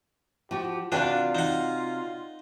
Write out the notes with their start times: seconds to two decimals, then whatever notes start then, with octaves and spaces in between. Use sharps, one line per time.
0.51 F3 F#4 G4
0.92 C3 D4 F4 F#4 B4 D5 F5 G5
1.35 D#4 F#5